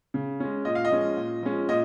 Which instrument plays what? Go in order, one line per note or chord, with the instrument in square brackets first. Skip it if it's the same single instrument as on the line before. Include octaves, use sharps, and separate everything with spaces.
[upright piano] C#3
G#3 C#4
A#2 D#5
F5
D#5
F3 G#3 C#4
A#2
F3 G#3 C#4
A#2 D#5